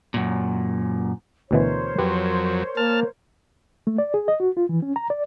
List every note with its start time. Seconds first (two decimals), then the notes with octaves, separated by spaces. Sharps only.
0.14 F#2 A#2
1.51 D2 B2 E3 A#4 C5 C#5
1.98 F2 F#3 G4 B4
2.77 A#3 A5 F6
3.87 A3
3.98 D5
4.14 G#4
4.28 D#5
4.40 F#4
4.57 F4
4.69 E3
4.82 C#4
4.96 A#5
5.10 D5